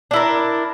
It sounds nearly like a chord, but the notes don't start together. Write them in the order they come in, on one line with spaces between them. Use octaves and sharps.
D4 E4 A#4